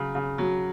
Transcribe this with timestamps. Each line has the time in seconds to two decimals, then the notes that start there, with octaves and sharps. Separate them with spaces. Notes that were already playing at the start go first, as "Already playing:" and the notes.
Already playing: C#3 F#3
0.15 C#3
0.38 F#3